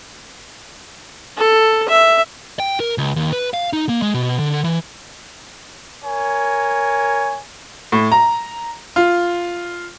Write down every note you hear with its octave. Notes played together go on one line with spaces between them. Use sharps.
A4
E5
G5
A#4
C#2
D#2
B4
F5
D#4
A#3
G#3
B2
D3
E3
A#4 C#5 G#5
A2
A#5
F4